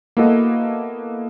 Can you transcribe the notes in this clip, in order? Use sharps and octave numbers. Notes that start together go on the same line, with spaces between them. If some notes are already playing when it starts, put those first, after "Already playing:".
A#3 B3 E4 F#4 A4 D#5